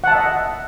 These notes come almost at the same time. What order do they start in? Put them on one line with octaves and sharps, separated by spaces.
F#5 A5 E5 D#5